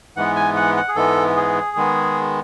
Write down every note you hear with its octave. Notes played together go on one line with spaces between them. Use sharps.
G#2 E3 G#3 B3 F#5
G#5
F#5
F#5
G#4
G#2 E3 G#3 B3 A4
G#4
D#3 G#3 B3